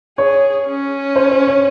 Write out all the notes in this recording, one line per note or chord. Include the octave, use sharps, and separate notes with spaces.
G#4 C#5
C#4
C5
C5
C#5